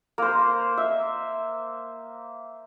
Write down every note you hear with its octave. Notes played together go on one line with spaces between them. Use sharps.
A#3 C5
E5